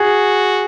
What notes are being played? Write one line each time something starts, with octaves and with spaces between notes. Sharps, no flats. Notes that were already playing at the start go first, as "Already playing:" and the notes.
Already playing: F#4 G#4